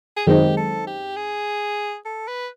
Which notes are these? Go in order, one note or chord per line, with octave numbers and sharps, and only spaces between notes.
G#4
F#2 D#3 G#3 C4 D#4 G4
A4
G4
G#4
A4
B4